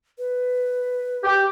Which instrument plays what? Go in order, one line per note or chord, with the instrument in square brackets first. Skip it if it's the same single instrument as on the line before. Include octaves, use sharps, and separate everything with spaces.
[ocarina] B4
[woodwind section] G4